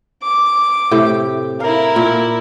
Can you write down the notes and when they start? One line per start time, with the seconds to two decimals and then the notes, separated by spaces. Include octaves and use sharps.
0.23 D6
0.91 A2 C3 G4
1.60 E4 A#4 F5
1.96 A#2